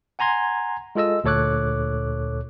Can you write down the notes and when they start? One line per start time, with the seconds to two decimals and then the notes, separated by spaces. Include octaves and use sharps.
0.19 F#5 G#5 A#5 C6 G#6
0.95 G#3 F4 A4 D#5 E6
1.24 D2 A#2 A4 C#5 D6 F#6